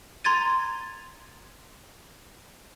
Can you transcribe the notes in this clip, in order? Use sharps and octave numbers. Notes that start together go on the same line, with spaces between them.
A#5 C6 G#6 A6 D#7